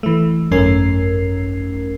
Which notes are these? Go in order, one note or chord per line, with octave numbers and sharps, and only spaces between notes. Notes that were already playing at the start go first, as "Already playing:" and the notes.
E3 A3
G#1 F#2 A3 C#4 A#4 C7